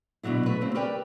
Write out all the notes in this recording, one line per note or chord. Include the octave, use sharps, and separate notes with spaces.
B2 D3 E3 F#3 E4
A3 B4
C#3 C4 C#4
G4 A#4 B4 D5 G5